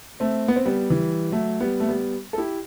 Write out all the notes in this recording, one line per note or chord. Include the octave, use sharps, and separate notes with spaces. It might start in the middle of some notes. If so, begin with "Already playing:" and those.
A3 C4
B3
C4
G3 B3
E3 G3
F#3 A3
G3 B3
A3
G3 B3
A4
E4 G4